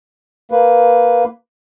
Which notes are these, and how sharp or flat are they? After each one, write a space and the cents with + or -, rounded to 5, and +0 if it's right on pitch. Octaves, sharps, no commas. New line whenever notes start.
A#3 +0 B4 +0